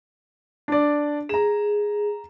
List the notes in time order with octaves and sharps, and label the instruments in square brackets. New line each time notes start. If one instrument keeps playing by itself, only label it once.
[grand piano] D4 D5
[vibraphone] G#4 [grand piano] A#5 E7